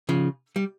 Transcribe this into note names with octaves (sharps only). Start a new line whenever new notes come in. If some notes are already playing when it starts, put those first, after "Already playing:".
C#3 F3
G3